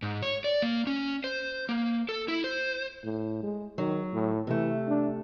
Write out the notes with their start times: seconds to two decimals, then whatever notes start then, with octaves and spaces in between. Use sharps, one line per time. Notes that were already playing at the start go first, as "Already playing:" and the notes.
0.02 G#2
0.23 C#5
0.44 D5
0.62 A#3
0.87 C#4
1.24 C5
1.69 A#3
2.09 A4
2.28 E4
2.44 C5
3.04 A2
3.43 G#3
3.78 D#3 F#3
4.13 A2
4.47 C3 E3 A3
4.88 D4